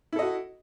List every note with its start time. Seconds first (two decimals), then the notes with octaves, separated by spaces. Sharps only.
0.13 E4
0.16 A4
0.19 D#5
0.22 F#4